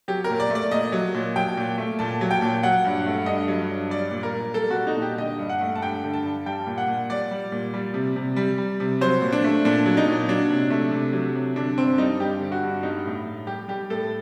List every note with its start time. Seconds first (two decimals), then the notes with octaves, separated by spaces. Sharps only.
0.08 F#3 G4
0.24 A#4
0.29 A#2
0.40 D5
0.50 A3
0.55 D5
0.71 A#2 D#5
0.92 F#3
1.14 A#2
1.36 F#3 G5
1.57 A#2
1.78 A3
1.99 A#2 A5
2.21 F#3
2.31 G5
2.42 A#2
2.63 F#3 F#5
2.85 G2
3.06 A3
3.26 G2 D#5
3.48 F#3
3.69 G2
3.90 G3 D5
4.11 A#2
4.23 A#4
4.33 A#2
4.54 G3 A4
4.71 F#4
4.76 G3
4.87 D#4
4.96 A#2
5.02 G4
5.18 D3 D#5
5.39 G2
5.49 F#5
5.61 A3
5.75 A5
5.82 G2 G5
6.04 D3
6.13 A5
6.24 G2
6.46 G3 G5
6.67 A#2
6.78 F#5
6.88 A#2
7.10 G3 D5
7.31 G3
7.52 A#2
7.74 G3
7.94 C3
8.16 C3
8.36 G3
8.58 G3
8.80 C3
9.01 F#3 C5
9.22 A#2
9.33 D4
9.44 A3
9.65 A#2 D4
9.86 F#3
9.97 D#4
10.08 A#2
10.29 F#3 D4
10.50 C3
10.70 A3
10.92 C3
11.13 F#3
11.35 C3
11.56 D3 D4
11.77 G2 C4
11.98 G3 D#4
12.20 G2 G4
12.41 D3
12.52 F#4
12.63 G2
12.83 G3 D#4
13.05 A2
13.26 A2
13.47 G3 G4
13.68 G3 G4
13.90 A2 A4